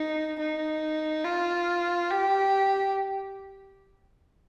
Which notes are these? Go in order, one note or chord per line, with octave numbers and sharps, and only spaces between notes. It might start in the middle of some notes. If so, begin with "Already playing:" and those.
Already playing: D#4
D#4
F4
G4